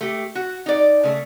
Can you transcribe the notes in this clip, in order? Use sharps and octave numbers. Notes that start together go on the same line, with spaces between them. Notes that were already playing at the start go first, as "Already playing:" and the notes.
A3 G4
F#4
D#4 D5
C#3 A3